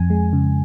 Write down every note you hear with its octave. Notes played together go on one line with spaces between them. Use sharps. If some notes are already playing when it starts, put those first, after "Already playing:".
Already playing: F2 G#5
G#3
C#3